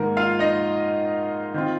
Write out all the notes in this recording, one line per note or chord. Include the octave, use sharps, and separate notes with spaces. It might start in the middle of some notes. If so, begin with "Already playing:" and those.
Already playing: G#2 D#3 A#3 A#4
F4 F5
D#4 D#5
D#3 C4 F4